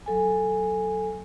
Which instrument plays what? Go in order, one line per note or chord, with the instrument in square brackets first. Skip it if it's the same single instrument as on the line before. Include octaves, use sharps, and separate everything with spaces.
[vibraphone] F#3 A4 G#5